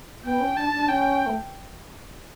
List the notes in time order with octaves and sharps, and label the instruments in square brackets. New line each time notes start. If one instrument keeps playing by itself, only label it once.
[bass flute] B3 [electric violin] G5
[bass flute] C#4
[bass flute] D4 [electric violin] A5
[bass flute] D4
[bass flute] C#4 [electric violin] G5
[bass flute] A3